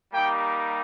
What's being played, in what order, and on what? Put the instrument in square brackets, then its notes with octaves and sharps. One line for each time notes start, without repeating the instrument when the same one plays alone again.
[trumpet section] G3 A#3 D#4 G4 G5